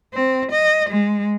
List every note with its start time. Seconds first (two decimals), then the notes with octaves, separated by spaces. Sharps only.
0.13 C4
0.51 D#5
0.89 G#3